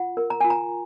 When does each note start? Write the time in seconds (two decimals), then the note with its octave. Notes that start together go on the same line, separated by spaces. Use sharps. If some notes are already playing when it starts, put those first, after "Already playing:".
Already playing: F4 F#5
0.17 A#4
0.30 A#5
0.41 F4 G#5
0.50 A#5